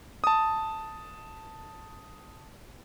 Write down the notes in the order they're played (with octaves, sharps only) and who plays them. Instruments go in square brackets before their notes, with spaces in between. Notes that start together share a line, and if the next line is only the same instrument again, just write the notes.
[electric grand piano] A5 D#6